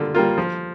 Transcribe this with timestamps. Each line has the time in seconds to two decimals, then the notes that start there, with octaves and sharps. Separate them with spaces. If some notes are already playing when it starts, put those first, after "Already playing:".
Already playing: D3 G3 A#3 F4
0.15 G3 A#3 F4
0.38 F3